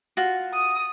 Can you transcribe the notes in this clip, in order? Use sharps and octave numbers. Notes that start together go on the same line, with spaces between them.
F4 F#4
D#6